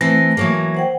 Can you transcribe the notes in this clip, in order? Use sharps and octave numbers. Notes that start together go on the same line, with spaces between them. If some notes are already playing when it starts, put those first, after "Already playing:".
E3 A3 C4 A#6
E3 F#3 A#3
C5 F#5 G5